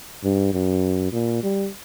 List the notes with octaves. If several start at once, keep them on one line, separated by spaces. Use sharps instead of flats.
G2
F#2
A#2
G3